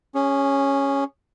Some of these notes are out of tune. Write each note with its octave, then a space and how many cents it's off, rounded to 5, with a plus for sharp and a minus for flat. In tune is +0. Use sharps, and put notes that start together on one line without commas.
C#4 +0 G#4 -30